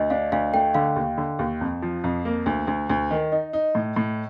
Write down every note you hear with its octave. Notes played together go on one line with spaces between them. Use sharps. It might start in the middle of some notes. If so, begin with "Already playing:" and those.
Already playing: D2 D#5
D4 F5
D2 F5
A3 G5
D3 F5
D#2
D3
D#2
F2
F3
F2
A#3
D2
D2
D2
D#3
D#4 D#5
D#4
A2
A2